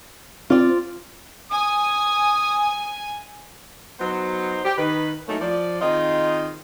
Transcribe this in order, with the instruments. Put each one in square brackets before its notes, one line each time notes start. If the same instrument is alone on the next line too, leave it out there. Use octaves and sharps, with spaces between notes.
[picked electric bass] C4 [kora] F4 D5
[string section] G#5 [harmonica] D#6
[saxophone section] F#3 B3 D#4 C5
G4
D#3 B4
F#3 A3 A#3 C#4 D#4 E4
F3 D5
D#3 C4 D#4 F4 G#4 D#5